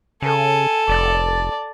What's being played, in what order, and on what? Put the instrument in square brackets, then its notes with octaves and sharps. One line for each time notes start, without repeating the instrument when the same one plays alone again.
[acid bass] C#3 [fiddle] A4 [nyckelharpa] G#5
[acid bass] F1 [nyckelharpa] D5 A5